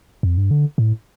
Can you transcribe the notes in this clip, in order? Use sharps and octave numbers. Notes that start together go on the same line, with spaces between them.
F2
G2
D3
A2